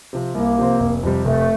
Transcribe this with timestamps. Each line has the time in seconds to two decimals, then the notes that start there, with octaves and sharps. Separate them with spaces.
0.13 C3 F3 C4
0.35 C2 A#3
0.58 C3 F3 C4
0.80 F1
1.03 F2 C3 G3
1.25 F1 A3